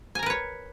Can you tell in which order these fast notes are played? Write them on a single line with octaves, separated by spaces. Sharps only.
G#5 A#5 A#4 B4 C#5